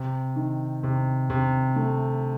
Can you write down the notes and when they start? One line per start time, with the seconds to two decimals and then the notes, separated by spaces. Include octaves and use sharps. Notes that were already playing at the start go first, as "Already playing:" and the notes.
Already playing: C3
0.36 D#3
0.83 C3
1.30 C3
1.76 A3